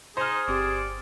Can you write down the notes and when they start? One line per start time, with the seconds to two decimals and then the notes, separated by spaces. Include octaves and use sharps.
0.17 D#4 G#4 C5 F6
0.48 G1 C4 G4 D5